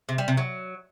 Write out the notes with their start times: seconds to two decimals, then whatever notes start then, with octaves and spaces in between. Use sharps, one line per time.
0.09 C3
0.18 G3
0.28 C3
0.37 F#3